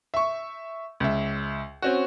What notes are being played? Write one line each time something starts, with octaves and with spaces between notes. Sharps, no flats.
E5 C#6
C#2 E5
C4 C#4 F#4